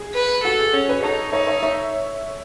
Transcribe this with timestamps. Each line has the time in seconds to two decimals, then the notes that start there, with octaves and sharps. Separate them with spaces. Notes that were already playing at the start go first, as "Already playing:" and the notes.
Already playing: G#4
0.15 B4
0.44 F#4 A4
0.59 G#4
0.73 C#4
0.89 G#4 B4
1.03 D#4 A4 C#5
1.32 D#4 C#5 E5
1.47 C#5 E5
1.63 C#5 E5